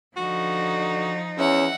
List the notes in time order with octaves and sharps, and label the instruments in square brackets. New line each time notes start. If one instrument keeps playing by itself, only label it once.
[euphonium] D3 [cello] F3 D#4 [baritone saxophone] F#4
[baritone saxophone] E2 [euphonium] C#4 [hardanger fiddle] E5 F#5